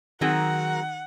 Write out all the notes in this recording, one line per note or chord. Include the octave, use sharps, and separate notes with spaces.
D#3 F#3 C4 F#4 G#4 A#4 F#5 A#5